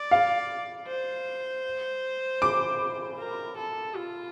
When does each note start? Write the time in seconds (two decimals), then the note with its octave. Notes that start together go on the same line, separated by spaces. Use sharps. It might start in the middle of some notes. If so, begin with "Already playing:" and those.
Already playing: D5
0.11 F5
0.88 C5
2.42 D6
3.18 A#4
3.58 A4
3.95 F4